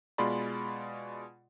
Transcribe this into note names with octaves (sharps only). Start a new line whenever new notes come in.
B2 G#3 F4 D5 B5 C6